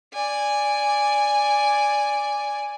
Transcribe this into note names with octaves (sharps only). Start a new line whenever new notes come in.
D5 G#5